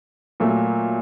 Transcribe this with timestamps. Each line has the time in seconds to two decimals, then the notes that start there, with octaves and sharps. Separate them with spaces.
0.40 A#2 F#3 A3